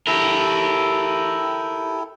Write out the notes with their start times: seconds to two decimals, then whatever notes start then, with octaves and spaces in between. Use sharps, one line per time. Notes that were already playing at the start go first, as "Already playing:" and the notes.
0.07 E4 G4 A4 A#4